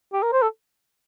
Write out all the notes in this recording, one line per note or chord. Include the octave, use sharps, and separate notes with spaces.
G4
A#4
C5
A4